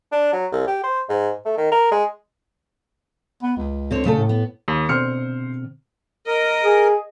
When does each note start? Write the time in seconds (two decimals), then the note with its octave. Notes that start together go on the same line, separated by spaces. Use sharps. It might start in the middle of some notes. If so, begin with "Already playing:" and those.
0.12 D4
0.33 F#3
0.52 C2
0.67 G4
0.84 C5
1.09 G#2
1.45 A3
1.58 D#3
1.71 A#4
1.92 G#3
3.43 B3
3.57 C#2
3.91 D3 C4 C#5
4.05 A#2 C#3 A3 A4
4.16 A2
4.29 B3
4.68 D#2
4.89 B2 D3 C4 C5 F6 C#7
6.27 A#4 D#5
6.63 G#4